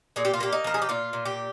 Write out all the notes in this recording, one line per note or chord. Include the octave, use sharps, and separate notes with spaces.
A#2 G#4
G4
F4
A#3 G4
D#4
F3 A#4
G#4
G4
A#2 F4
A#2
G4